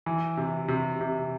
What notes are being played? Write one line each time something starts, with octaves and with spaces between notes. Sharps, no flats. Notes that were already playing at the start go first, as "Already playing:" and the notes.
E3
C3
C3
C3